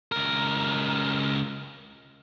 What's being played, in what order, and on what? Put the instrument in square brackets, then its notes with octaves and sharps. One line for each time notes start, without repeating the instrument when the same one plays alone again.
[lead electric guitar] C#2 A#4